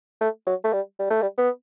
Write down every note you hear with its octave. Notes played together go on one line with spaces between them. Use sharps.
A3
F#3
A3
G3
G3
A3
G3
B3